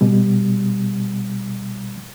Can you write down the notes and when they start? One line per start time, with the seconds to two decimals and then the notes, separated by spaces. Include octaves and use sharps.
0.01 B2 G3